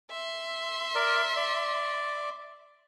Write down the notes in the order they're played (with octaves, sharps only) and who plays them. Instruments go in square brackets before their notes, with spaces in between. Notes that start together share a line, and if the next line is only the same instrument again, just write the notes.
[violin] E5 C6
[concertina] A#4 D5
D5